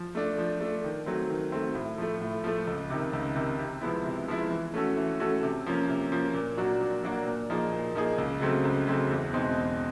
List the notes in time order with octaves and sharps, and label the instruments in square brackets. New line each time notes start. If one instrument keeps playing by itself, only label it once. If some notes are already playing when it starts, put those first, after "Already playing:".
Already playing: [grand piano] F3
A3 D4
F3
A3 D4
D#3
F#3 A3 C4
D#3
F#3 A3 C4
A2
F3 A3
A2
F3 A3
C#2
C3 D#3
C#2
C3 D#3
C3
F3 G#3 B3 E4
C3
F3 G#3 B3 E4
E3
A3 C#4 F#4 A4
E3
A3 C#4 F#4 A4
C3
F3 A#3 C#4
C3
F3 A#3 C#4
A#2
F#3 A#3 D4 F#4
A#2
F#3 A#3 D4 F#4
A#2
F3 A#3 D#4 G#4
A#2
F3 A#3 D#4 G#4
C#2
C#3 F#3 A3 C4
C#2
C#3 F#3 A3 C4
E2
B2 G#3 C4 D#4
E2